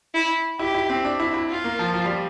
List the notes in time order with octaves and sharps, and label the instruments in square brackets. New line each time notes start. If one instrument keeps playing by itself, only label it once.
[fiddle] E4
[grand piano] E4 [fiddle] G4
[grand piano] E4
C4
D4
E4
E4
[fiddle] F4
[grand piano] A#3
F3
F3
G3